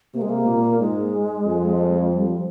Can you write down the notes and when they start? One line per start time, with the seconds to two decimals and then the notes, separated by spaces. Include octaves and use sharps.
0.14 C3 A#3
0.22 G#3
0.30 A#3
0.47 A#2
0.80 G#2 G#3
1.46 F2
2.13 G3
2.27 F3